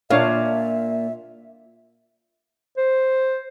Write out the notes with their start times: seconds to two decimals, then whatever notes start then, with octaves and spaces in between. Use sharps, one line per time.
0.10 A#2 D4 C#5 E5 F5
2.78 C5